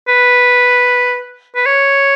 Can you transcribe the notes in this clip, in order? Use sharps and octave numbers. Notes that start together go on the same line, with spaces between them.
B4
B4
C#5